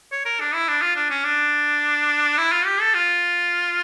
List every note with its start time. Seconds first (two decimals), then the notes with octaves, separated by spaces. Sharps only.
0.12 C#5
0.26 A#4
0.40 D4
0.54 E4
0.68 D4
0.82 F4
0.96 D4
1.10 C#4
1.25 D4
2.38 E4
2.52 F4
2.66 G4
2.81 A4
2.94 F4